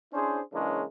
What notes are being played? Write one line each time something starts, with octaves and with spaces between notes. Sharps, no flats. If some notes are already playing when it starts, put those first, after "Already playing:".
C#4 D4 E4 G#4 C5
C#3 E3 G#3 A#3 C#4 D4